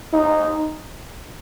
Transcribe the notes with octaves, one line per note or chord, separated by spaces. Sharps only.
D#4